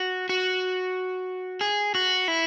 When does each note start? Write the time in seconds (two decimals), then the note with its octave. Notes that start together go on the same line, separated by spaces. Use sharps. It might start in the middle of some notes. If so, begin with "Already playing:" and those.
Already playing: F#4
0.29 F#4
1.61 G#4
1.95 F#4
2.28 E4